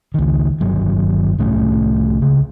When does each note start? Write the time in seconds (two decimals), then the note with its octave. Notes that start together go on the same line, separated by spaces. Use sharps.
0.14 C#2 D#3
0.61 G1 G2 D#3 F#3
1.39 C2 A2 A3 C#4
2.22 D2 C#3